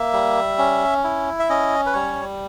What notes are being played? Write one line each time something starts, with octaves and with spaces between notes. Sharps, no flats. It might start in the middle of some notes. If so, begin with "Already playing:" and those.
Already playing: A#3 E5
G3
C#4
E4
E5
C#4 D#5
B4
G3 C#5